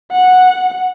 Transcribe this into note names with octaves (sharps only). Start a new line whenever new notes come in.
F#5